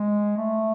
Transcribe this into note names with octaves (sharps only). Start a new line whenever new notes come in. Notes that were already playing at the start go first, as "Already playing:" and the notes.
Already playing: G#3
A3